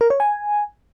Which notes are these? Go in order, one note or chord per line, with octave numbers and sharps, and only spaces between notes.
A#4
C#5
G#5